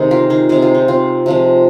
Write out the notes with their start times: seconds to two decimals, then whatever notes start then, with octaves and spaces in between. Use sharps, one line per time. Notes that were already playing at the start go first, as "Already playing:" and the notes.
Already playing: C3 D#3 G#3 D#4 G#4
0.11 F4 A#4
0.30 D#4 G#4
0.49 C3 G#3 G#4
0.62 F4
0.74 D#4
0.88 C4 F4
1.26 C3 F3 G#3